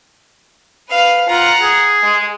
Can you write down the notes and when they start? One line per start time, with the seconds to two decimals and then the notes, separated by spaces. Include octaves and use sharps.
0.90 B4 F5
1.29 F4 F#5 A#5
1.62 G#4
2.03 G#3